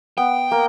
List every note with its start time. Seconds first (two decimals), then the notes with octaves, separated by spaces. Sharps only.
0.17 B3 G5
0.51 A#3